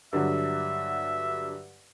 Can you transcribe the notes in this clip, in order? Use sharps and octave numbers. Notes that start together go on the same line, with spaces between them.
G2 D3 F#3 E5